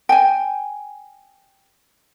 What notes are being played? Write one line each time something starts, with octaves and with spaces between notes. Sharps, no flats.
G5 G#5